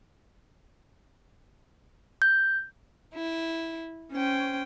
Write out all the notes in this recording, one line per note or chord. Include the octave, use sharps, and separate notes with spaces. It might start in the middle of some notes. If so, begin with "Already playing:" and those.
G6
E4
C#4 C5 G5